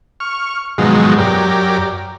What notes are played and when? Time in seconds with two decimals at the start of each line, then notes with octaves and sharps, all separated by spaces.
0.20 C#6 F6
0.78 G#2 B2 D#3 F3 F#3 G#3
1.18 F#2 G4 A#4 D5